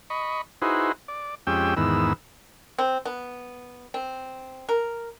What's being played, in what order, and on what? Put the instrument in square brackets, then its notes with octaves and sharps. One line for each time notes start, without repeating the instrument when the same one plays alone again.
[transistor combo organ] D#5 B5 C#6
D#4 E4 F#4 G#4 B4 C5
D5
F2 G#3 C#4 G4 G5 E6
E2 G#2 D#3 B3 E6
[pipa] C4
B3
C4
A#4